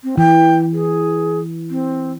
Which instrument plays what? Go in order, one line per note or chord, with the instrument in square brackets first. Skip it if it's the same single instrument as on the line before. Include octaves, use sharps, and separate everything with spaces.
[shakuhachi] C4
[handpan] E3 [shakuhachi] G5
[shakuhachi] G#4
C4